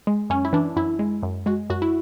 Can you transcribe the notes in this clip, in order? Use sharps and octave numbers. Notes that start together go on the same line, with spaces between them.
G#3
F#2 C#4
E4
E3 D4
F#2 E4
G#3
F#2
G#3 F#4
F#2 F#4
E4